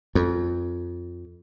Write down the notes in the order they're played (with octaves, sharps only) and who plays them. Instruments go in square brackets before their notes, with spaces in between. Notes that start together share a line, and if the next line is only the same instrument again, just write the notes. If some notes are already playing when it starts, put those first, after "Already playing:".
[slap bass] F2